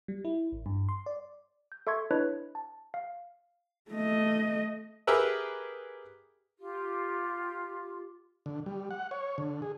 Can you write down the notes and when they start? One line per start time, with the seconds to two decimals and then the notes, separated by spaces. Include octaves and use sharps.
0.08 G3
0.25 E4
0.52 A1
0.66 G2
0.89 C6
1.06 D5
1.72 G6
1.87 A4 E5 C6 C#6 G#6
2.11 D4 E4 B4 C#5 D#5 B5
2.55 A5
2.94 F5
3.91 A3 D#5
5.07 G4 G#4 A#4 B4 E5
6.59 F4 G4
8.46 D3
8.66 G3
8.91 F#5
9.11 C#5
9.38 D3
9.62 G#4